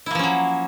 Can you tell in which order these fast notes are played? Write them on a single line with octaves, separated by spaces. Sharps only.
E4 A#3 F3 C#4 F#3